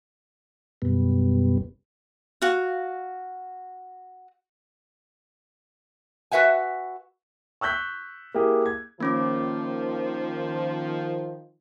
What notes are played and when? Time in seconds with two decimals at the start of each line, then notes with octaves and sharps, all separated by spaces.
0.82 F#2 B2 G3 B3
2.42 F#4 F5
6.31 F#4 B4 E5 F#5 G#5
7.61 C#6 E6 F#6 G6 B6
8.34 A#3 E4 G4 G#4
8.66 G#6
9.00 D#3 F3 A#3 C#4 D6